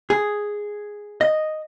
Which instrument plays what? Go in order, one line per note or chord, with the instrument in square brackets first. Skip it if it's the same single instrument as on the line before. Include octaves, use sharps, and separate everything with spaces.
[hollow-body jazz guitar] G#4
D#5